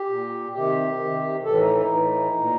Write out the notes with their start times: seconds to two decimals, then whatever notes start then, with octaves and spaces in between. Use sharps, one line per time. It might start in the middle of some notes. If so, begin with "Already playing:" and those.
Already playing: G4
0.09 A#2
0.54 C3 D#3 G4
1.00 C3 D#3
1.45 A2 E3 A4
1.61 D#4
1.75 D#4
1.91 A2 E3
2.37 A#2